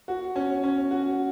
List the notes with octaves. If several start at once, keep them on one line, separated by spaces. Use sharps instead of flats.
F#4
C#4
C#4
F#4